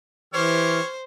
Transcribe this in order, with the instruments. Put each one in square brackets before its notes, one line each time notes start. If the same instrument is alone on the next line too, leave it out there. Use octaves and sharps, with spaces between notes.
[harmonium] E3 [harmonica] G4 C#5 F6 [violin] C5